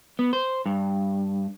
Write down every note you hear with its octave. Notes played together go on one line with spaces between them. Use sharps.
B3
C5
G2